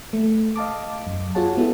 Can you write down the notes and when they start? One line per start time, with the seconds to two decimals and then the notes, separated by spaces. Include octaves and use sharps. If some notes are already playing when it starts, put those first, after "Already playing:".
0.13 A3
0.56 D#5 F5 A5 D6
1.07 F#2
1.35 F4 F#4 G#4 C#5 F#5 A5
1.57 B3 E4 F#4 A4